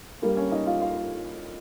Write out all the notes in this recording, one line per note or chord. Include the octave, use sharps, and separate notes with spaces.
G2 G3 A#3 A#4
C#4 C#5
D#4 D#5
F4 F5
F4 F5